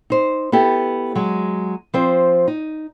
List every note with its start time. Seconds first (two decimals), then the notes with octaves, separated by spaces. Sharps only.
0.10 D#4 C5
0.52 B3 E4 G4 A4
1.15 F#3 G#3
1.94 F3 C4 C5
2.48 D#4